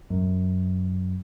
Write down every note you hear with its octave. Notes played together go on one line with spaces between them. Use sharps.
F#2